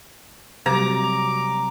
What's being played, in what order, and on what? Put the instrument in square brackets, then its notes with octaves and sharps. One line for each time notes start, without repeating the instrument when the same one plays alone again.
[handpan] C3 F#3 G3 [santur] A#5 [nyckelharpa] D6